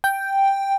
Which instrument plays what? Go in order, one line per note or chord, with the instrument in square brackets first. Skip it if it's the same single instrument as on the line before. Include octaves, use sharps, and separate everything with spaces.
[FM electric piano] G5